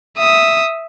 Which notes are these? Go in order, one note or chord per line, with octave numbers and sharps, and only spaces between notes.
E5 D#6